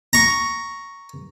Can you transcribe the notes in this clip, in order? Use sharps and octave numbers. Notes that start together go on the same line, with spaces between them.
A#5 C#6